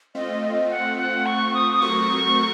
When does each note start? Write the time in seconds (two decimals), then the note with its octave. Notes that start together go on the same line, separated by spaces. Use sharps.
0.15 A3 C4 F4 D#5
0.42 D#5
0.70 F#5
0.98 F#5
1.26 C#6
1.54 D#6
1.72 D#6
1.81 F#3 A3 C4 F#4 A#4 C#6